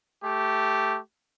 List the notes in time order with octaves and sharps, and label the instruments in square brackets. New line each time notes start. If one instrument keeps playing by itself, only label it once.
[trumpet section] A3 G4